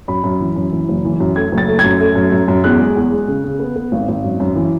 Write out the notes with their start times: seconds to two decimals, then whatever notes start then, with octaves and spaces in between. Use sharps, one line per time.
0.08 F#2 B5
0.24 F#2
0.40 E3
0.56 F#2
0.72 E3
0.89 F#1
1.05 E3
1.20 F#2
1.36 A3 G#6
1.52 F#1
1.58 A6
1.68 A3
1.79 G#6
1.84 F#2
2.01 A3
2.15 F#2
2.32 F#2
2.48 F#2
2.64 E2 F#6
2.80 G#3
2.96 E2
3.12 G#3
3.28 C#3
3.44 C#3
3.59 B3
3.76 B3
3.92 G#1
4.08 G#1
4.24 F#2
4.40 F#2
4.56 E3